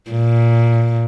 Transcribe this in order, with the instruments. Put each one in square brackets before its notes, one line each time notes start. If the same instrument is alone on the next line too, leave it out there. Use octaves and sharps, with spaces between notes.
[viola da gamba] A#2